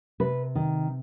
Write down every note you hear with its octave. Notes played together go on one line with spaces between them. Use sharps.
C3 B4
D#3